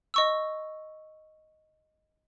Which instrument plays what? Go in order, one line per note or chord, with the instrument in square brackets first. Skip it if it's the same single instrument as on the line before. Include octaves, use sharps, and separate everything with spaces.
[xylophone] D#5 C#6 E6